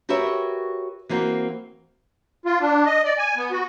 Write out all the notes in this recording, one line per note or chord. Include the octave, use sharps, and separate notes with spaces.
F#4 G4 A#4 B4 C#5 E5
E3 A#3 C4 F#4
F4
D4
D#5
D5
G#5
B3
F#4